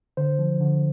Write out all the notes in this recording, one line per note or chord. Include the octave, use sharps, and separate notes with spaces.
D3 C5
F3
D3